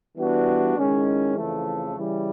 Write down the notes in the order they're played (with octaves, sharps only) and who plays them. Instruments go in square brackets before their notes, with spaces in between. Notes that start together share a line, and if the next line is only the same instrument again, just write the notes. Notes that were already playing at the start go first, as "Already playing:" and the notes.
[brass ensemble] E3 G3 B3 D4 F#4
D#3 G#3 C#4 E4
F2 C#3 E3 A3
C#3 E3 G3